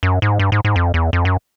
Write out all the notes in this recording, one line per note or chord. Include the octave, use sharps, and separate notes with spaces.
F#2
G#2
G2
G#2
G#2
F2
E2
F2
F#2